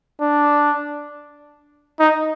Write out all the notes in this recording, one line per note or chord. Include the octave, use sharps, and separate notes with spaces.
D4
D#4